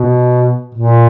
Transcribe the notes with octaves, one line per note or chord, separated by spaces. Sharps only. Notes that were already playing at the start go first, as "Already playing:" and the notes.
Already playing: B2
A#2